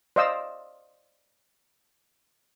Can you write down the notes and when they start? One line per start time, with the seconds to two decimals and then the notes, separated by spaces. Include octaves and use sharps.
0.16 C5 D5 D#5 F5 E6